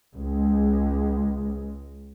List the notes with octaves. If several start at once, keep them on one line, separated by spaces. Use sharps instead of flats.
C#2 G#3